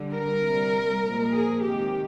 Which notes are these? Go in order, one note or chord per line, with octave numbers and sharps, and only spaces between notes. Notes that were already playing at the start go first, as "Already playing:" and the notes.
Already playing: D3 G3
A#4
C3 G3
A#2 F3 G#3
G#4
C3 D#3 G#3 G4